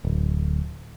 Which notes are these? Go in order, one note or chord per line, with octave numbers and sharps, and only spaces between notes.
D1